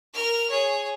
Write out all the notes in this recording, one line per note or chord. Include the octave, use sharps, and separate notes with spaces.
A#4 F6
G#4 C#5